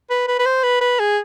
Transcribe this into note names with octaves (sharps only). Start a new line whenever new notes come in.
B4
B4
B4
C5
B4
B4
G#4